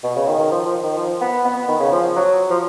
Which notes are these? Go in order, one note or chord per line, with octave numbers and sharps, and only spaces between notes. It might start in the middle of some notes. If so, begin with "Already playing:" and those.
B2
C#3
D#3
D#3
F3
F3
D#3
F3
B3
B3
B3
D#3
C#3
F3
F#3
F3